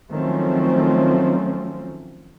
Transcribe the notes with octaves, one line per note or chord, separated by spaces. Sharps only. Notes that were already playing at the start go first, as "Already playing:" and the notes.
D#3 F3 F#3 A3 C4 C#4